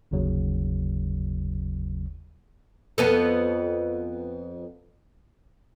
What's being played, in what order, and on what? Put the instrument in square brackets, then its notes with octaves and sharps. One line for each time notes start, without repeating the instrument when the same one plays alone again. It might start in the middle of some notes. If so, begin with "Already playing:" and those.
[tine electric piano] G1 D#2 C#3 F#3
[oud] F2 B3 A4